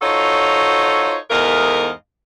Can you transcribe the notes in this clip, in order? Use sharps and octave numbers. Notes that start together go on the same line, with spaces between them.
D#4 F4 F#4 A4 C5 C#5
E2 G#2 A3 A#4 D#5 F5